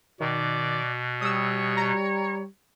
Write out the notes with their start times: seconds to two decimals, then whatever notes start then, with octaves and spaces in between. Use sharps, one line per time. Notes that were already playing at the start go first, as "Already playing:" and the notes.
0.20 B2 D#3 D5
1.21 G3 C#5 D#6 E6
1.77 A#5